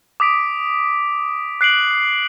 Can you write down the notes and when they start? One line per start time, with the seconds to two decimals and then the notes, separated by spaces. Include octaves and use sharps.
0.20 D6 D#6 B6 D7
1.61 F#6 C7 D7 F#7